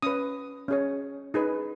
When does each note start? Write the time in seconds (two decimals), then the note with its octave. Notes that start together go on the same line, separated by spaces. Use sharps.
0.03 C#4 B4 D#6
0.68 C#4 G#4 C#5
1.34 D#4 G#4 B4